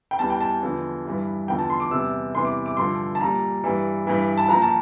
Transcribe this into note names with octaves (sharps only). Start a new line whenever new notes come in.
G5
E2 E3 G3 A5
G5
A5
E2 D3 F3
G2 E3 G3
E2 D3 F3 G5
A5
C6
D6
E2 C3 G3 E6
E2 C3 E3 G3 C6
D6
D6
G2 D3 F3 C6
A5
A#2 G3 A#5
G2 E3 G3
G2 E3 G3
A5
A#2 F3 A#5
A5